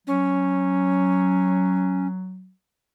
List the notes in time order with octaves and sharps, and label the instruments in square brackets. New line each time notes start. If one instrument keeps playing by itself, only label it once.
[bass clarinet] F#3 [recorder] C#4